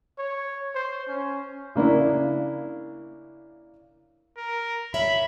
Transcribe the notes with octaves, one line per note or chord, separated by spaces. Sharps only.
C#5
C5
C#4
C#3 A#3 D4 E4
A#4
C#5 E5 B5